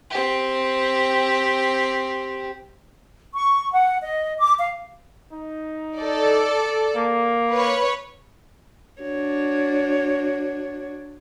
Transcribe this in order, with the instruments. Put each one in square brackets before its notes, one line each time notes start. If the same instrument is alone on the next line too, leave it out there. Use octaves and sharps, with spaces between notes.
[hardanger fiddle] C4 G4
[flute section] C#6
F#5
D#5
D6
F5
[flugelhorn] D#4
[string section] A4 D5
[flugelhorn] A#3
[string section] B4 C#5
[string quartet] D4 F#4 C#5